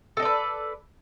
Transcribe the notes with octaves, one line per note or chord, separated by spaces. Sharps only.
A4 B4 D5 D#5